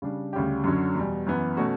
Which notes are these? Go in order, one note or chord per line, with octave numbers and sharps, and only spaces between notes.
C#3 G3 D4
D2 C#3 G3 C#4 G4
F#2 D3 F#3 C#4
E2 B2 G3
F#2 E3 B3
B2 A3 C#4 F#4